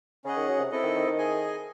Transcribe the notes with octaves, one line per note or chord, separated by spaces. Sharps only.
C#3 C#4 G#4 D#5 F#5
D#3
F#3
C3
C4 E4 A4 D#5
D#3
D#3
D#3
G#4 D#5 G#5